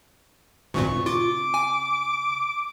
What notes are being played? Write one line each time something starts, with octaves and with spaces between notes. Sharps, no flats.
D2 G2 A#2 C#3 C4 C#6
F4 D6
G#5